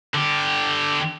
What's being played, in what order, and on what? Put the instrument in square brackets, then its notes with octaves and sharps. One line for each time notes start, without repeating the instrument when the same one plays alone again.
[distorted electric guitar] D3 G4